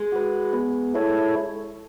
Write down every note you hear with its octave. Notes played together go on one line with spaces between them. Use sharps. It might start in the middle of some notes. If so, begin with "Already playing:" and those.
Already playing: G#3
F#4 B4
B3
E4 A4 C#5